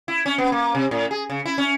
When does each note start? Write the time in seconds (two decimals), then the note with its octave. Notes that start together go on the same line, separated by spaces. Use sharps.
0.08 E4
0.26 C#4
0.38 B3
0.52 A#3
0.75 C3
0.91 A2
1.11 G#4
1.30 C#3
1.46 E4
1.58 C#4